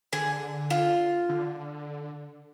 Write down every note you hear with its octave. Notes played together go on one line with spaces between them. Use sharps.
D3 G#4
F4
D3